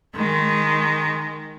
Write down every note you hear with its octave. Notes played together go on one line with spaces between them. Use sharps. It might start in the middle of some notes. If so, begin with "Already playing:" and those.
D#3 G#3